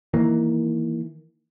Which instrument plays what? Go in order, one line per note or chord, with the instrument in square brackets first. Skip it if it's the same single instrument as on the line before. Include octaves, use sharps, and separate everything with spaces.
[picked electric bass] D#3 E3 A#3